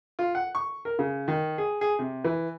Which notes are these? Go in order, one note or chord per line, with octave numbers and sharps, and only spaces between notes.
F4
F#5
C#6
A#4
C#3
D#3
G#4
G#4
C3
E3